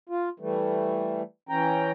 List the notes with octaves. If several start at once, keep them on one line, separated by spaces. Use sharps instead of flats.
F4
E3 G3 A3
E3 C#4 G5 A#5